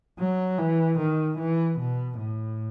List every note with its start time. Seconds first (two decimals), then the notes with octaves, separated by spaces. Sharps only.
0.19 F#3
0.58 E3
0.99 D#3
1.39 E3
1.79 B2
2.19 A2